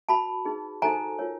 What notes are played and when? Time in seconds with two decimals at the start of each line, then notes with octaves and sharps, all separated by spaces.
0.09 F#4 B4 A5 B5
0.45 D#4 G#4 B4
0.82 D#4 F#4 A4 C5 G#5 A#5
1.19 F4 A#4 C#5